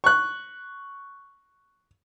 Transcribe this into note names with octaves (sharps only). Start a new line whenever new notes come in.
C#6 F#6